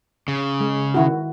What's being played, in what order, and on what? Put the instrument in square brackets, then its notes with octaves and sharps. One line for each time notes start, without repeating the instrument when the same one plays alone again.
[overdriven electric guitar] C#3
[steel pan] G#3
D#3 E4 F#4